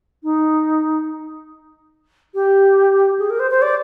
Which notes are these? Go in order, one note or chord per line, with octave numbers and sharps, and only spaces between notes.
D#4
G4
G#4
A#4
C5
C5
D5